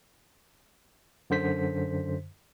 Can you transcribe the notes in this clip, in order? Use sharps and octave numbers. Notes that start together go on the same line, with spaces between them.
F#2 D3 C5 B6